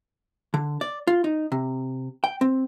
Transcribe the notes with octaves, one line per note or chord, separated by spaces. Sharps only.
D3
D5
F4
D#4
C3
G5
C4